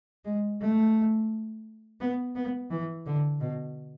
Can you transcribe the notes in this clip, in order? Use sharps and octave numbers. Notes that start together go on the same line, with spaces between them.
G#3
A3
B3
B3
E3
D3
B2